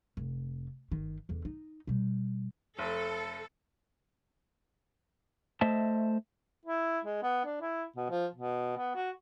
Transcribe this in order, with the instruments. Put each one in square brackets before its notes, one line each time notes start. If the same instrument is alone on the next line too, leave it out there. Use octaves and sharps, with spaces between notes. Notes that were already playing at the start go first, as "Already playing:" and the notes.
[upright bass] F1
G1 D#3
E2 D3
D#4
B2 G3
[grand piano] F1 [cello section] A4
[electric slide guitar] A3 C5 D#5 E5 A5
[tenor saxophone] E4
G#3
B3
D4
E4
B2
F3
B2
B3
F#4